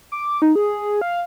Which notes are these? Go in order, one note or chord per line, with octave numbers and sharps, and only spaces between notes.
D6
D#4
G#4
F5